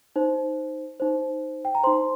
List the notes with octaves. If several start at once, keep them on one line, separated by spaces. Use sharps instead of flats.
D#4 C5
D#4 C5
G5
A#5
D#4 C5 C6